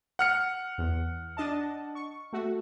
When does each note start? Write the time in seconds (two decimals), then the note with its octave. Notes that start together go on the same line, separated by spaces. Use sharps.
0.19 F#5 F6 C#7
0.78 E2
1.37 D4 D#5 A5
1.95 C#6
2.33 A3 F#4